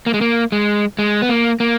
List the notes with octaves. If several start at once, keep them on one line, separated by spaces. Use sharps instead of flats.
A#3
G#3
A#3
G#3
G#3
B3
A#3
A#3